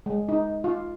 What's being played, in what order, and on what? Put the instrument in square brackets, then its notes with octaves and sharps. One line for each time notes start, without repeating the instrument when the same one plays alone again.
[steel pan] G#3
D#4
F4